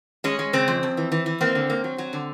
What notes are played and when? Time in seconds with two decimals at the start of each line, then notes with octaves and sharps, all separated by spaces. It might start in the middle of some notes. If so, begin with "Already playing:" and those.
0.24 G#3 C#4
0.39 G#3
0.53 C#3 C4
0.68 F2
0.83 F2
0.97 E3
1.12 E3
1.26 E3
1.41 A#3 C4
1.55 D3
1.70 A#3
1.84 F#3
1.98 F#3
2.13 D3